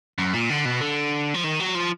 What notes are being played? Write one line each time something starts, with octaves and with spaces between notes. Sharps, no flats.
F#2
A#2
D3
B2
D3
F3
D#3
F#3
F3